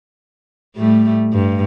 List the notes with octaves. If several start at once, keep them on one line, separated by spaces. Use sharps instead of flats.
A2 G3 A3
G2